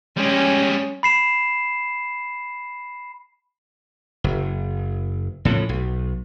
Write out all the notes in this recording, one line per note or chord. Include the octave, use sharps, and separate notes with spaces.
G3 G#3 C#4
B5 C7 E7
F#1
A2 C#3 F3
B1